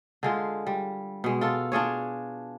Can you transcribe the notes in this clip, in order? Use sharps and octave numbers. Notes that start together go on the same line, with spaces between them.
D3 G#3 F4
G3
B2 G#3
F4 A4
D4 F4 G#4 C#5